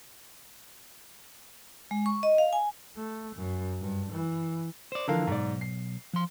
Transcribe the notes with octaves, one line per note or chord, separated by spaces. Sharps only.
G#3
C#6
D#5
F5
G#5
A3
F#2
G2
E3
C5 D5
D3 E3 F3 A4 A#4 F5
B1 G#2 D5
C7
F3 C6